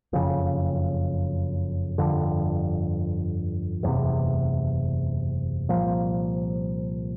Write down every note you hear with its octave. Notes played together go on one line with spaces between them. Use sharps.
F#1 F2 C#3
G1 F2 D3
F#1 E2 C3
C2 A#2 F3